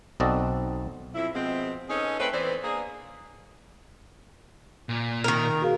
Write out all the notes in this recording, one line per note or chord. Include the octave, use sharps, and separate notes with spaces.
B1 C4 F#4 A4 D5 D#5
F2 E4
B2 F3 G#3 C4
C#4 D#4 G#4 A4 B4
A3 C4 C#4 B4
E3 B3 C4 C5 D5
A#3 D4 G#4
A#2
D#3 A#4
F#4 G#4 F5